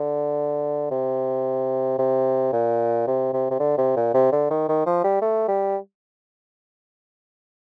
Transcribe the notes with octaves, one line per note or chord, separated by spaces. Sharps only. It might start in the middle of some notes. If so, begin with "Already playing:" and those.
Already playing: D3
C3
C3
A#2
C3
C3
C3
D3
C3
A#2
C3
D3
D#3
D#3
F3
G3
A3
G3